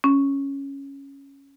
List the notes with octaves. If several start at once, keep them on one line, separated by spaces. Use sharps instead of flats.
C#4